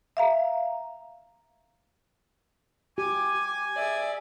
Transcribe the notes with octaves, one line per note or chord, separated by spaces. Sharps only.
E5 F5 A#5
G4 G#5 D6
G#4 D5 E5